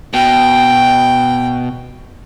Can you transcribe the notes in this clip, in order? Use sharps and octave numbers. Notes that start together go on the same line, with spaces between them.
B2 G5